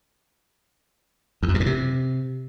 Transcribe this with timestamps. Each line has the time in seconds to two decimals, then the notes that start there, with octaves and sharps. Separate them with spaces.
1.43 E2
1.48 F#2
1.54 G2
1.60 A#2
1.66 C3